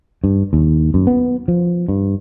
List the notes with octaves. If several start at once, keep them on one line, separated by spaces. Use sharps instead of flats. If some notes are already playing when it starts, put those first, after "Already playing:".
G2
D#2
F#2
B3
F3
G2